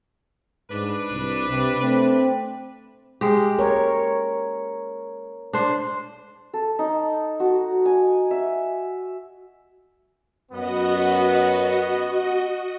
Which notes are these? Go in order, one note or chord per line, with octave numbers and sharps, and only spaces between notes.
G#2 D4 B4
C2
C3
A3 C4
G#3 G4
A#4 C#5
D4 C5
A4
D#4
F#4
G#5
E5
F#2 B3 F#4 D#5